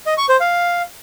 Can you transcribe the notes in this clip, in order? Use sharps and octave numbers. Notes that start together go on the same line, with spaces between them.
D#5
C#6
C5
F5